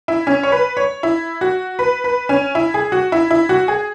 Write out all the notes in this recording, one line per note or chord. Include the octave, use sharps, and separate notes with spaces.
E4
C#4
C#5
B4
C#5
E4
F#4
B4
B4
C#4
E4
G#4
F#4
E4
E4
F#4
G#4